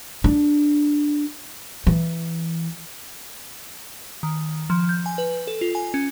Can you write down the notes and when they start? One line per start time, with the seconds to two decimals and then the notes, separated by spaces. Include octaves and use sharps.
0.24 D4
1.87 E3
4.23 D#3
4.70 F3
4.89 G6
5.06 G#5
5.18 B4
5.47 A4
5.61 F4
5.75 G#5
5.94 C#4